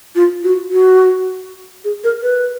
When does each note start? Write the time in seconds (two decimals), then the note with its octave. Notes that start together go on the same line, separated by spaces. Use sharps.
0.16 F4
0.44 F#4
0.72 F#4
1.84 G#4
2.04 A#4
2.22 B4